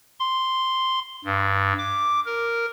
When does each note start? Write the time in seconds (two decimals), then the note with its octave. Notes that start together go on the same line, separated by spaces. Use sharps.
0.20 C6
1.25 G2
1.78 D6
2.26 A#4